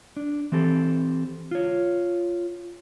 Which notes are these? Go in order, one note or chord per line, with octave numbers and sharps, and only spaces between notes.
D4
E3 C4 G4 A4
F4 C#5